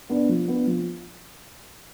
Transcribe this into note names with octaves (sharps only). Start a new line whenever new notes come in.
B3 D4
F3
B3 D4
F3